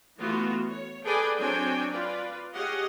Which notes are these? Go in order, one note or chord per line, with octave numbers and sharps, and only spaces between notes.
E3 A3 B3 F4 F#4
C#5
G#4 A4 B4 D5 G5 G#5
F#3 C4 D4 C#5 G5 G#5
F4 B4 D5
G4 G#4 C#5 D#5 F5 F#5